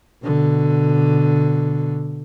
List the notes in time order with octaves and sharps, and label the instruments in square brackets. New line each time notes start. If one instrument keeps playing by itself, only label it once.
[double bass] B2 D3